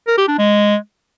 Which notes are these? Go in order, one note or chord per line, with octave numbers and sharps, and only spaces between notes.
A#4
G4
D4
G#3